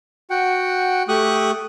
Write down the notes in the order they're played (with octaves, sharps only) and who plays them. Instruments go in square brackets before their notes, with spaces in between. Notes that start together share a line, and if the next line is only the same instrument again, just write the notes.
[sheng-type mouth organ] F#4 F#5 G5
A3 G4 C#6 D#6 F#6